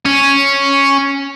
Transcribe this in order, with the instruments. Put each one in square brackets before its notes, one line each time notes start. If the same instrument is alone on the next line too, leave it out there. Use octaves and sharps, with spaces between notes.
[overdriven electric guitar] C#4